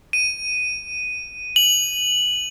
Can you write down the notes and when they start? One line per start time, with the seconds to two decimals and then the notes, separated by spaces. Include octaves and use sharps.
0.13 D#7
1.56 F#7